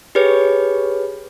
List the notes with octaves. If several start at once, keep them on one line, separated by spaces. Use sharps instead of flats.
G4 G#4 B4 C#5